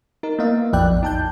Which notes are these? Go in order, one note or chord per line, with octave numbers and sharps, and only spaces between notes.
D#4 A#4
A#3 B3 E4 D#5 F5
A#1 F2 F3 D5 G5 F#6
A1
D#4 A5 G6